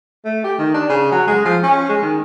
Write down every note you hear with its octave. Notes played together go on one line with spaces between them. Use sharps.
A3
G4
D#3
D4
C#3
F#3
G#3
F3
C#4
G#3
D#3